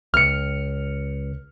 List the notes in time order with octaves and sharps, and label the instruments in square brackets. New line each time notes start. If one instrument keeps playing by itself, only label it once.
[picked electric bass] C#2 [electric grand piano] F6 C#7